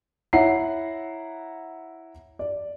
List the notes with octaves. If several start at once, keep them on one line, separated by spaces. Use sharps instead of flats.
E4 C#5 F#5 A#5 C7
D5